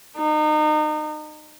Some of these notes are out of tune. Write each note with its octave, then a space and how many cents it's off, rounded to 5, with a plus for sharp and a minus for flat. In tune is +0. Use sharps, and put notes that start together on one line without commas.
D#4 -30